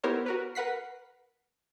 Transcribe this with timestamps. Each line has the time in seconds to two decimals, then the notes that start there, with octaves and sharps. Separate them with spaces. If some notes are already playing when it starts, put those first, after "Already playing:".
0.04 B3 E4 G4 A#4 C5 C#5
0.26 F#4 A#4 B4
0.55 A#4 B4 F#5 B6 C7